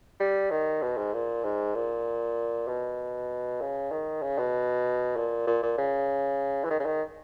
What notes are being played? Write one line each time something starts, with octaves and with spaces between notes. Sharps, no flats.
G3
D#3
B2
G#2
A#2
G#2
A#2
B2
C#3
D#3
C#3
B2
A#2
A#2
A#2
C#3
E3
D#3
C#3
D#3